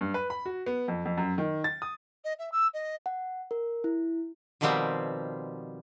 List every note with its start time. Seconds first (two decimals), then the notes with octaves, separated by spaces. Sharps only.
0.01 G2
0.14 B4
0.30 B5
0.46 F#4
0.66 B3
0.88 F2
1.05 F2
1.18 F#2
1.38 D#3
1.64 A6
1.82 D#6
2.24 D#5
2.39 E5
2.52 E6
2.73 D#5
3.06 F#5
3.51 A#4
3.84 E4
4.61 B2 D#3 F3 G3 B3 C4